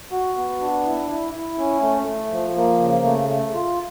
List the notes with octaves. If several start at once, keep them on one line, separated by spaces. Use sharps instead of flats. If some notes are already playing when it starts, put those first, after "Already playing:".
F#4
B3
D4
E4
E4
E4
C#4
A3
A3
F3
A#3
C#3
A3
A3
F4